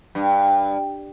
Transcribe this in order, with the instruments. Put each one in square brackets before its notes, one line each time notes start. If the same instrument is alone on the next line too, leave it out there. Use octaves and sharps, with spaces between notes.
[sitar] G2